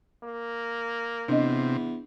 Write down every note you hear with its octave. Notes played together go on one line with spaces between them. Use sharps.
A#3
E2 C3 D4 D#5